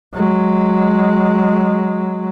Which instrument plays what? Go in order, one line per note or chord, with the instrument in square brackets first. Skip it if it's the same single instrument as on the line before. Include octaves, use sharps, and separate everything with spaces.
[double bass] F#3 G#3